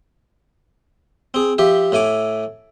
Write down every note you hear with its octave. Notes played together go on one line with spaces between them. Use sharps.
C4 G#4
F3 G4 E5
A2 A3 G#5 D6